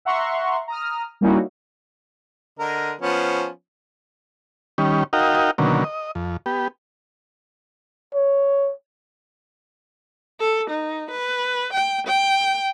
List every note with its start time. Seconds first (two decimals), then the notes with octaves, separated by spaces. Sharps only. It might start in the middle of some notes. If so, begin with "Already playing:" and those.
0.05 E5 F#5 A#5 C6 C#6
0.68 A#5 D#6 F6
1.21 G3 A#3 C#4 D#4 E4 F#4
2.59 D3 A#4 D#5
3.01 F3 B3 C#4
4.78 D#3 G3 C#4
5.13 D#4 F#4 A#4 D#5 F5 G5
5.58 B2 D3 D#3 F#3 A#3 C#4
5.84 D#5
6.15 F2
6.46 B3 G4
8.15 C#5
10.40 A4
10.71 D#4
11.11 B4
11.73 G5
12.07 G5